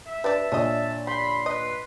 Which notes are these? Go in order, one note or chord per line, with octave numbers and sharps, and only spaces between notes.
E5
D4 G4 B4 D5 A5
A#2 D4 G#4 C#5 D#5
G4 B5 C6
B4 D#5